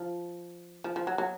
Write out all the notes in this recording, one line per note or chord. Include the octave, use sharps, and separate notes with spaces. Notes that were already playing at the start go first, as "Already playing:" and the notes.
Already playing: F3
F3
F3
F#3
F#3